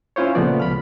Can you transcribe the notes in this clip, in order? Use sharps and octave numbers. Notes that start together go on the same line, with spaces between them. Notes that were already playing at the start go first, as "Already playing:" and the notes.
C#4 E4 F4 C5 C#5
A#2 C#3 F3 A3 B3 D5
C#2 B5 F6